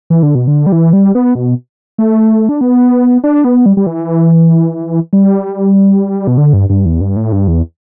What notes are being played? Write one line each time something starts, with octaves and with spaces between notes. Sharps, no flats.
E3
D3
B2
D3
G3
E3
G3
B3
B2
A3
D4
B3
D4
B3
G3
G3
E3
G3
B2
D3
G2
G2
E2
G2
A2
G2
E2